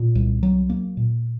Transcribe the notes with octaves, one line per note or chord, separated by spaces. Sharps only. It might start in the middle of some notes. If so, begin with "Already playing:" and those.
Already playing: A#2
C2
F#3
A#3
A#2